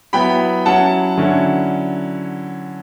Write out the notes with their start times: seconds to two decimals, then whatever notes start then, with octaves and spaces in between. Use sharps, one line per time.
0.13 F#3 B3 E4 G5 B5
0.66 F#3 C#4 E4 F#5 A5
1.18 D3 F#3 C#4 E4